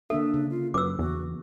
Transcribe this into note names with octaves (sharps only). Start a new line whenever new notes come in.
D3 A#3 D4 A4 E5
C#3
F4
F#2 B4 D6 E6
E2 F#4